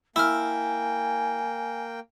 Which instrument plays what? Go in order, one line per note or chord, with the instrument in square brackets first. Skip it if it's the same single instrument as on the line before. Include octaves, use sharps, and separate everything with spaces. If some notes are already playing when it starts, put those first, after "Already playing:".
[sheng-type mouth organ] A#3 G5 [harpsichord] E4 [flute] G#5 [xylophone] E6 F6